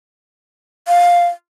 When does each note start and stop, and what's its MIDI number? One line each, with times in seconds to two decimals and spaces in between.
0.87 1.27 77